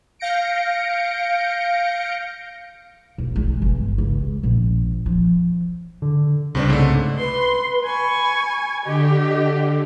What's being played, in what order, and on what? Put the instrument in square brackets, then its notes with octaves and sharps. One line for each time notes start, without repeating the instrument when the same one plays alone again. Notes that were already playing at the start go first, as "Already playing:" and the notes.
[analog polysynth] F5 G6 A#6 C#7 D7
[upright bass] B1
G#3
G1
C#2
A#1
F3
[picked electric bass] D3
[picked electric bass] C2 C#3 [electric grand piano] G2 C4 D4
[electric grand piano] G#2 A3
[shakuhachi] B4 [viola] C6
[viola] G#5 C#6 [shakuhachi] B5
[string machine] D3 [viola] G4 [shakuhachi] D#5